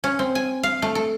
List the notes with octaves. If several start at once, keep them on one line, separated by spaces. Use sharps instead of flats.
C#4
C4
G#5
F5
A3
A4